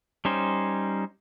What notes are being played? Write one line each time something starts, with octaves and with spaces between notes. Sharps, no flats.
G3 C#4 D#4 C5